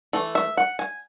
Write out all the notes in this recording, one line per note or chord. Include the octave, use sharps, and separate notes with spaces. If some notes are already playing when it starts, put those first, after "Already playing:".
E3 A3
E5
F#5
G#5